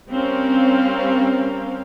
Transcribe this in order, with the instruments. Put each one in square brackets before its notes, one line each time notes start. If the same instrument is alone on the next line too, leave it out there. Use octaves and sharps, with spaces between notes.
[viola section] G3 C4 C#4 A#4 F5